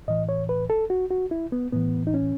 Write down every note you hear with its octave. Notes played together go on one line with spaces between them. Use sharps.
A2 E3 D#5
C#5
B4
A4
F#4
F#4
E4
B3
A2 E3 B3
D#4
C#4